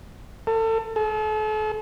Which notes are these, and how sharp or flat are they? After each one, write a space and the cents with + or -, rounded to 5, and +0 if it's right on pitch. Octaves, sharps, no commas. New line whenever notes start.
A4 +30
A4 -40